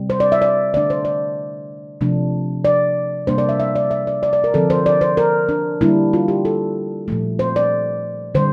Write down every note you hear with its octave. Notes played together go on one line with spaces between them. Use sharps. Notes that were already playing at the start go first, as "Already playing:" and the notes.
Already playing: C3 G3 C4
C5
D5
E5
D5
D3 A3 D4 D5
C5
D5
C3 F3 A3 D4
D5
C3 G3 A#3 D4 C5
D5
E5
E5
D5
E5
D5
D5
D5
A#4
D3 F3 C4 A4
C5
D5
C5
A#4
D4
D3 G3 A#3 D4 E4
F4
G4
A4
A#2 F3 A3
C5
D5
D3 G3 C5